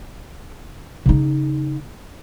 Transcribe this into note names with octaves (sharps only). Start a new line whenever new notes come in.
C#3 D#4